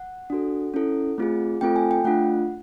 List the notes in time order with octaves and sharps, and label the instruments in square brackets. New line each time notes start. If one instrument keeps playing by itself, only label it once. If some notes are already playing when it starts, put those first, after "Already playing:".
Already playing: [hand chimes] F#5
D4 F#4 A4
C#4 E4 A4
A3 C4 F4 G#4
A3 C4 F4 A4 G5
G#5
G5
A3 D4 F4 F#5